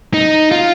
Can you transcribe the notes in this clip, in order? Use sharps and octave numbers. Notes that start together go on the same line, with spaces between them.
D#4
F4